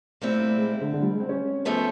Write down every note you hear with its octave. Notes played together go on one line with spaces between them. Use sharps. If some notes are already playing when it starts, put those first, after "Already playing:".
A#2 G3 A3 C4 E4
A3
G#3
D3
D3
G3
G#3
C4
C#4
G#2 F3 A3 B3 C#4